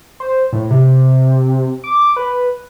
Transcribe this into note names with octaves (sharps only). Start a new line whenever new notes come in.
C5
A2
C3
D6
B4